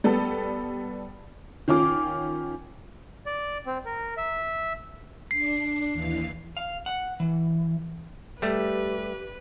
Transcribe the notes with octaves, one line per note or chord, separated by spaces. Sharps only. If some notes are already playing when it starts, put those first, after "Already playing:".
G3 B3 A4
D#3 C#4 F4 D6
D5
C4
A#4
E5
D4 C7
D#2 E3 F5
F5
F#5
E3
G3 A3 G4 B4